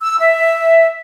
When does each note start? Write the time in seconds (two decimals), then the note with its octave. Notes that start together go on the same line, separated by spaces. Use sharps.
0.01 E6
0.20 E5